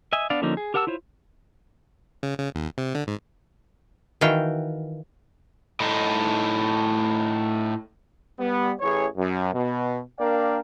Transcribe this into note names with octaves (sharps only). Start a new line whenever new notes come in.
D#5 E5 G#5
B3 D4 D5 F5
D3 F3 A#3 C#4 D#4
G#4
G4 A#4 F#5 A5 E6
E4 F4 C5 C#5
C#3
C#3
D#2
C3
D3
G#2
D#3 E3 F#4 F5 G5
A2 D#4
G3 B3
A1 E3 G#4 C#5
F#2
B2
A#3 D4 A#4 D5 F5 G5